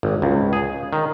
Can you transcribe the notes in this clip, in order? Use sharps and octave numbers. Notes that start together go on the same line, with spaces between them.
G#1
C#2
G#4
D#3